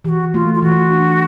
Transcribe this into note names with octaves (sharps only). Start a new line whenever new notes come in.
E3 F#4 G4
A3 F4
F4
E3 F#4
D4